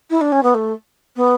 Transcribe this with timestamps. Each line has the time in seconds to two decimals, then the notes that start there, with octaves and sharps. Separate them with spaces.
0.10 E4
0.21 D4
0.32 C#4
0.43 B3
0.54 A3
1.16 B3